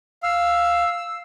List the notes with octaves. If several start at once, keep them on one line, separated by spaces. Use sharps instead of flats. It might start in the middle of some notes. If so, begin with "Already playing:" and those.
F5 E6